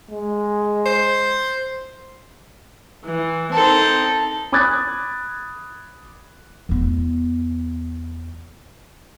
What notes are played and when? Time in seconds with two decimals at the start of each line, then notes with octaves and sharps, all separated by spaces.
0.10 G#3
0.86 C5
3.06 E3
3.53 C4 D#4 A4
4.52 B5 D6 D#6 F#6 G#6 A6
6.69 E2 B3